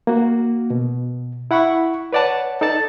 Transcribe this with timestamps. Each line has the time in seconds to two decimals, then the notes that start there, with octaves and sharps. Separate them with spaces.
0.07 A#3 F#4
0.70 B2
1.51 E4 F#5 B5 C#6
2.13 B4 C#5 D5 F#5 A5
2.61 D#4 A4 D5 A5 A6